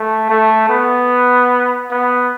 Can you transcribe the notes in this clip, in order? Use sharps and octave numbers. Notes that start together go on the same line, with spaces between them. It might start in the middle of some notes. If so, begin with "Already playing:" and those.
Already playing: A3
A3
B3
B3